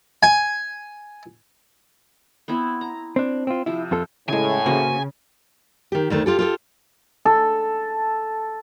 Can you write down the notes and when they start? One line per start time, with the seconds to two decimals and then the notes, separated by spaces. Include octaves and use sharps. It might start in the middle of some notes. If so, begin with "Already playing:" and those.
0.23 G#5
2.48 B3 C4 E4
2.81 A#5
3.16 C4 D4
3.47 C4 F4
3.66 C3 F3 E4
3.91 F2 F4 A4
4.28 A2 C#3 G#3 G#5
4.66 C#3 A#3 F#4 C5
5.92 D#3 G4
6.10 D2 D#3 A3
6.26 F4 G4 A4
6.39 F4 G4 A4
7.25 A4